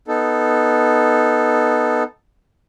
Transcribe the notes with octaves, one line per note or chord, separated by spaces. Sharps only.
B3 D#4 A4